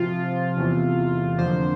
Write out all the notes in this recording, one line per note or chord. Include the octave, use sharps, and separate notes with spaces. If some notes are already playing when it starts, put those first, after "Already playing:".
Already playing: C3 F3 C4 F4
E2 C3 E3 A3
F2 D3 F3 A#3 C5